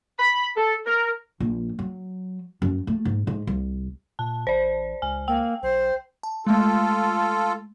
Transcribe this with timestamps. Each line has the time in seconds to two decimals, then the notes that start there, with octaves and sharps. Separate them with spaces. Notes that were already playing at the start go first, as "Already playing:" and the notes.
0.18 B5
0.56 A4
0.86 A#4
1.40 A#1
1.79 F#3
2.62 F#2
2.87 A3
3.05 G#2
3.27 G#2
3.47 C2
4.19 A#2 A5
4.47 A1 C5 D5
5.02 C#2 G#5
5.28 A#3 G5
5.62 B1 C5
6.23 A5
6.47 G#3 A3 F4 A4